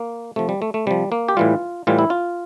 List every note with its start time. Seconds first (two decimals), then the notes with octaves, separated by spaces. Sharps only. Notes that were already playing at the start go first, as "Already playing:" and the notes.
Already playing: A#3
0.36 C3 F3 A3
0.49 G3
0.62 A3
0.74 A3
0.87 C3 F3 G3
1.12 A#3
1.28 G4
1.37 A2 E3 G3 F4
1.87 A2 E3 G3 F4
1.99 E4
2.10 F4